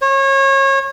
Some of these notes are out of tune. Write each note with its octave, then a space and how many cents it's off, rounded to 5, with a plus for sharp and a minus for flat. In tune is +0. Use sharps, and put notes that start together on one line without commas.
C#5 -30